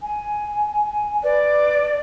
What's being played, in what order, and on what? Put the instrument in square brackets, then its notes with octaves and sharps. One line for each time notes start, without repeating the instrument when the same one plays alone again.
[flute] G#5
[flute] B4 [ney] D5